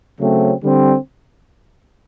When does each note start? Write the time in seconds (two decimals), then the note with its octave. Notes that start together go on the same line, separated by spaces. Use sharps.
0.20 C#3 F#3 A3 C4
0.61 D3 G3 C4